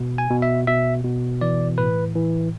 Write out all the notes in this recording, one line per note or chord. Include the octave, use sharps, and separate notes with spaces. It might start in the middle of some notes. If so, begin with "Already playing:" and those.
Already playing: B2
G#5
B2
E5
B2 E5
B2
E3 D5
A2 B4
E3